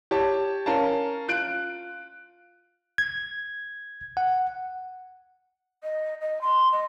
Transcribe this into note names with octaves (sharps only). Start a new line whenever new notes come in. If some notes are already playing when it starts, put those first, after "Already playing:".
G4 C#5 A5
C#4 A#4 F5 A5
F4 F#6 D7
G#6
F#5
D#5
D#5
C6
D#5